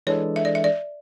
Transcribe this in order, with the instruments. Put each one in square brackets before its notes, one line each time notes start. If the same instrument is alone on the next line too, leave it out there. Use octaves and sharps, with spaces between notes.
[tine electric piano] E3 G#3 D4 A4 [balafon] C#5
[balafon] E5
D5
E5
D5